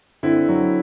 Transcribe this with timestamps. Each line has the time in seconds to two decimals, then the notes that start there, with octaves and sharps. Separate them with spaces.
0.23 D3 C4 E4
0.49 F#3